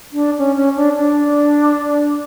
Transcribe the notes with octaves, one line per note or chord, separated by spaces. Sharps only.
D4
C#4
C#4
D4
D4